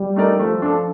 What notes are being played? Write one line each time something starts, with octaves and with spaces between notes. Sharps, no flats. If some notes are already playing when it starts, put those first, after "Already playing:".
Already playing: G3
A3 D#4 A#4 D5
F3 A3
D4 A4